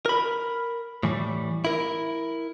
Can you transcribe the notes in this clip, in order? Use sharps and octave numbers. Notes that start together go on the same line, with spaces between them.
A#4 B5
A2 E3 G3
E4 A#4